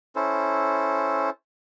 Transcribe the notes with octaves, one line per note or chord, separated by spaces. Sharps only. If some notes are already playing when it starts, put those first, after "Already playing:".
C#4 E4 A4 C5